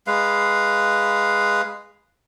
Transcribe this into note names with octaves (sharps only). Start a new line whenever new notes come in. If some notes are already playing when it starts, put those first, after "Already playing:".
G#3 B4 F5